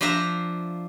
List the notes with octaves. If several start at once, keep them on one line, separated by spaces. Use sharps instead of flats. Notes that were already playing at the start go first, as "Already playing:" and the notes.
F3 D4 C5 E5 A#5